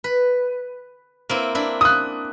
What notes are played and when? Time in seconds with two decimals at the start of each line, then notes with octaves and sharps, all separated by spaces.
0.04 B4
1.29 A#3 C4 E4
1.55 D4 E4
1.81 D#6 F#6